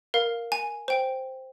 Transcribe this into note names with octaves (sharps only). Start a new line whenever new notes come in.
A#4 F5
G#5
C5 G5